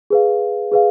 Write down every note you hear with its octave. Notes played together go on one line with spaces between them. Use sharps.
G#4 B4 F5
G#4 B4 F5